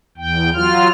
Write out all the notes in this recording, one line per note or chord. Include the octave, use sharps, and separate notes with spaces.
E2 G5
F#3 F4 F6